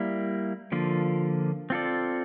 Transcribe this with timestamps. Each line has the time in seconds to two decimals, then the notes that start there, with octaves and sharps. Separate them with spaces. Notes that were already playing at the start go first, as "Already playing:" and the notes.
Already playing: G3 A#3 E4
0.72 D3 F3 A#3 F4
1.70 C4 F4 A4 D5